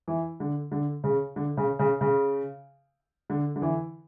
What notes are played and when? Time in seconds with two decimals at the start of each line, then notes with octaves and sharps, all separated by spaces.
0.08 E3
0.40 D3
0.72 D3
1.04 C#3
1.36 D3
1.57 C#3
1.79 C#3
2.01 C#3
3.30 D3
3.56 D3
3.62 E3